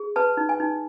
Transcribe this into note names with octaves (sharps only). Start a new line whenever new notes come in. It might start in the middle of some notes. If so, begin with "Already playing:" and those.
Already playing: G#4
B4 A5
D#4
G#5
D#4